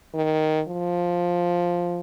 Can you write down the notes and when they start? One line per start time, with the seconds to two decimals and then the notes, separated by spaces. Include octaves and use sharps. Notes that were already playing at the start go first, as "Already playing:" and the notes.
0.15 D#3
0.68 F3